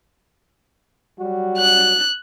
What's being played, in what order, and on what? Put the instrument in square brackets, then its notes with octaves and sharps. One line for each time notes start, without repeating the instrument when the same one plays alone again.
[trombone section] F#3 G3 F#4
[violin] F#6